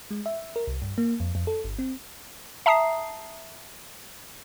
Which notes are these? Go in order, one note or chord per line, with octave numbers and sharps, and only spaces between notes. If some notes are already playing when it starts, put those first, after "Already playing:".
G#3
E5
A#4
C2
G2
A#3
F2
F2
A4
G1
C4
E5 A5 A#5 D#6 C7